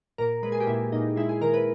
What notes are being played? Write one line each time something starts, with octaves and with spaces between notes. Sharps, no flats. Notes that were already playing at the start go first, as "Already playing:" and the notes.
A#2 A#4
G#3 B4
G#4
G4
A#2 E4
A#2 D#4
G#3 E4
G#4
D#3 A#4
B4